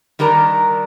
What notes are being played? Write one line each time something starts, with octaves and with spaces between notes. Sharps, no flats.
D#3 G3 D4 A#4 A#5